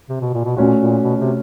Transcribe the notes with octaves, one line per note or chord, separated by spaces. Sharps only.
C3
B2
A#2
B2
A#2 A3 C#4 F#4
A#2
B2
C3